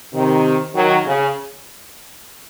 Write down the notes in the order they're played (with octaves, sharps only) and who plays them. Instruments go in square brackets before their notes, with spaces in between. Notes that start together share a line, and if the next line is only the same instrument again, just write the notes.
[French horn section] C3 D#3
D#3 F#3
C#3